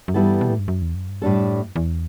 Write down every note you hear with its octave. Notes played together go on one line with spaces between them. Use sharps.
F#2
G2 E3 G3 B3 E4 A4
B2
A2
G2
F#2
E2
F#2
G2
F#2 A2 G3 D4 A4
E2